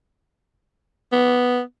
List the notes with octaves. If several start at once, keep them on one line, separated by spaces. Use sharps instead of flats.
B3